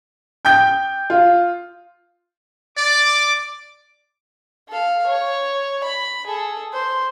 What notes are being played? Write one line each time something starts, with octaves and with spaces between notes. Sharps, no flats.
G5 G6
F4
D5 D6
A4 F5
C#5
B5
G#4 A4
C5